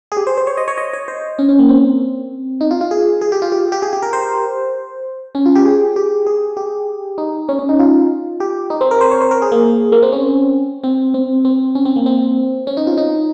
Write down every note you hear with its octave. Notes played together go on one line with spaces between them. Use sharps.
G#4
G4
C5
C5
C#5
D#5
C#5
D#5
C#5
C5
C#4
C#4
A#3
C4
D#4
F4
F4
G#4
G#4
G4
F4
G4
G4
G#4
G4
A#4
C5
C#4
F4
G4
G#4
G4
G#4
G4
D#4
C#4
C#4
D#4
F4
G4
D#4
C4
A#4
C5
C#5
C5
A#4
G#4
A#3
A#3
C4
C#4
C4
C4
C4
C#4
C4
A#3
C4
C#4
D#4
F4
D#4